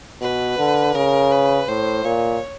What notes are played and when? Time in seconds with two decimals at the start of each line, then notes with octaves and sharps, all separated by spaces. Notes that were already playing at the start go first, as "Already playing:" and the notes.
0.21 B2 B4
0.58 D3
0.95 C#3 A#4
1.31 B4
1.68 A2 C5
2.04 A#2 C#5